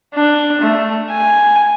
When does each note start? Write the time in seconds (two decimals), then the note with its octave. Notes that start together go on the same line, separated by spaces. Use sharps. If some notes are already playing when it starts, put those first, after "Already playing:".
0.14 D4
0.61 A3
1.10 G#5